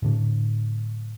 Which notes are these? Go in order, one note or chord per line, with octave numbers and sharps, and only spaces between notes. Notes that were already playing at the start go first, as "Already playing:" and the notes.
A2 D3 D4